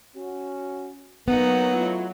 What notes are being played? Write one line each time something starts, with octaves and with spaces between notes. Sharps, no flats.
C#4 F#4
F#3 A#3 B3 D#4 F#5
A3 E4 F4